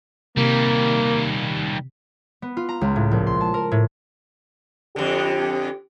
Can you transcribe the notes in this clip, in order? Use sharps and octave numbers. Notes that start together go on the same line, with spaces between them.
D#2 C3 G3 A#3
B3
F4
A#5
C#2
A2
A#1
C6
A5
A#4
A2
F2 D3 G4